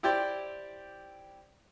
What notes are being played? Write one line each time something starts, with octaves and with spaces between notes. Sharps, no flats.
E4 G4 C5 D5 G5